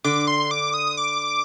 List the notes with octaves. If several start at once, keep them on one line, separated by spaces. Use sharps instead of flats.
D3 D6
C6
D6
D#6
D6